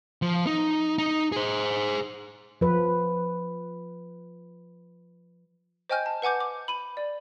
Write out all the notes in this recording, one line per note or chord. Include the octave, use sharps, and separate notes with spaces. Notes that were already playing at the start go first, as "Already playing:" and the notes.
F3
D#4
D#4
G#4 C5
F3 B4
C5 D#5 G5 G#5 F6 G6
A5
B4 F#5 G#5 D6 G6
D6
B5 D#7
D5